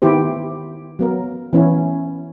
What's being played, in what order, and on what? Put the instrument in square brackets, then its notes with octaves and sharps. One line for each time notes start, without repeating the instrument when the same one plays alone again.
[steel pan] D#3 B3 E4 G4 C5
F#3 B3 A#4
E3 B3 C#4 E4